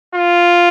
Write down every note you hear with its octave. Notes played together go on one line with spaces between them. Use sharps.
F4